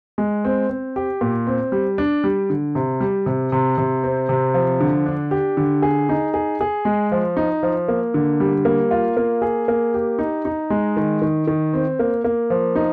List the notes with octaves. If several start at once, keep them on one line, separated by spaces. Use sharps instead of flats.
G#3
C4
C4
G4
A#2
C4
G3
D4
G3
D3
C3
G3
C3
C3
C3
C4
C3
F3
D3
D4
G4
D3
G#4
D#4
G#4
G#4
G#3
F3
D#4
F3
A#3
D3
G3
A#3
F4
A#3
G#4
A#3
G4
D#4
D#4
G#3
D#3
D#3
D#3
C4
A#3
A#3
F3
D#4